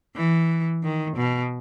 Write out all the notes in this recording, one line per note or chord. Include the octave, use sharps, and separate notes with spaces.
E3
D#3
B2